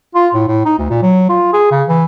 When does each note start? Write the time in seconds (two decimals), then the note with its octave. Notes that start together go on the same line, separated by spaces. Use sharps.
0.15 F4
0.34 A2
0.48 A2
0.65 D#4
0.78 D2
0.90 A#2
1.02 F#3
1.29 F4
1.53 G#4
1.71 C#3
1.88 E3